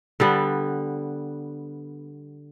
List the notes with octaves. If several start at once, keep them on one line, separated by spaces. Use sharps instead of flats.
D3 G3 B3